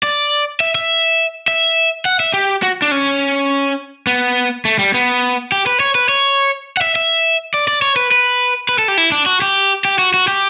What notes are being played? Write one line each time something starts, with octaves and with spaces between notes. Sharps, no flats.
D5
E5
E5
E5
F#5
E5
G4
F#4
D4
C#4
B3
A3
G3
B3
G4
B4
C#5
B4
C#5
F#5
E5
E5
D5
D5
C#5
B4
B4
B4
A4
G4
E4
D4
F#4
G4
G4
F#4
F#4
G4